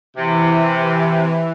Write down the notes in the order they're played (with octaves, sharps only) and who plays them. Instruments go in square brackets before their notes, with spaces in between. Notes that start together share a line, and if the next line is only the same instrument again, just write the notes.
[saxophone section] C3 [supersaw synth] E3